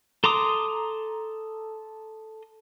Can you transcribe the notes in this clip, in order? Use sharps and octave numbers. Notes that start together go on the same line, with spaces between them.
A4 A#5 C6 D6 D#6